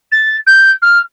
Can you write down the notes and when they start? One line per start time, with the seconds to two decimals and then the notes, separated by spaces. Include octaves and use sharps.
0.11 A6
0.46 G6
0.82 F6